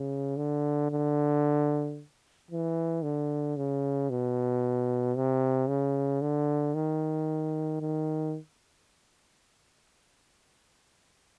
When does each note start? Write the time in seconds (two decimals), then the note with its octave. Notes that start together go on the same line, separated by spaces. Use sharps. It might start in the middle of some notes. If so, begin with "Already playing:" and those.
Already playing: C#3
0.37 D3
0.91 D3
2.51 E3
3.03 D3
3.57 C#3
4.10 B2
5.16 C3
5.69 C#3
6.22 D3
6.75 D#3
7.81 D#3